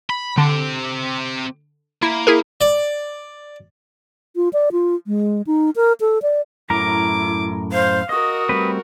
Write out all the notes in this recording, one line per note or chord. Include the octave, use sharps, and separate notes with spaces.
B5
D3 C4 G4
A#3 E4
E4 G#4 A#4
D5
F4
D5
F4
G#3
D#4
A#4
A4
D5
F#2 A2 E4 A#4 A#5 D6
C5 F5
F#4 A#4 D#5 D#6
G3 A3 C4 B4